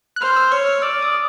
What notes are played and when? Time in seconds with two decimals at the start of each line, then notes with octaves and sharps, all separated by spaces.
0.16 F#6
0.21 C5 F6
0.36 E6
0.51 C#5 F6
0.66 F6
0.82 D5 E6
1.02 D#6